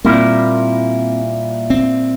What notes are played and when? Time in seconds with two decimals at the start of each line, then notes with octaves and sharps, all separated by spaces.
0.05 A#2 G3 A#3 C4 E4
1.70 C4